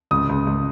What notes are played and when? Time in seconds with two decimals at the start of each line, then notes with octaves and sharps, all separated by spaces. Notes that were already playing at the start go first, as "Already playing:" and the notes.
0.11 C#2 D#6
0.29 C#2
0.47 C#2